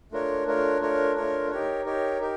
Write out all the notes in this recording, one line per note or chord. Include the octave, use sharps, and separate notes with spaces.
A3 D4 F4 A#4 C#5
A3 D4 F4 A#4 C#5
A3 D4 F4 A#4 C#5
A3 D4 F4 A#4 C#5
D#4 G4 A#4 C#5
D#4 G4 A#4 C#5
D#4 G4 A#4